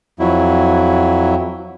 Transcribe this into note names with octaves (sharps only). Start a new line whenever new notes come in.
F2 F#3 E4